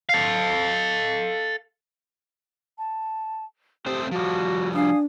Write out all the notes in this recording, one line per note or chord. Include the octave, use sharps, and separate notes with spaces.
A4 F5
A5
A3 C4 G4 C5 D#6
F3 G3 F#4
D4 F5 G#5 D#6